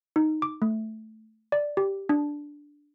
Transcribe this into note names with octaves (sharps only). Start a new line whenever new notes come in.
D#4
D6
A3
D5
G4
D4